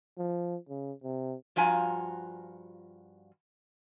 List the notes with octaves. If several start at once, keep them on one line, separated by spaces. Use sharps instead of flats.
F3
C#3
C3
G2 F3 F4 F#4 G#5 A#5